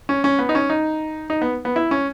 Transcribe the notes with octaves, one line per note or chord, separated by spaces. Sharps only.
C#4
C#4
B3
D#4
C#4
D#4
D#4
B3
B3
E4
C#4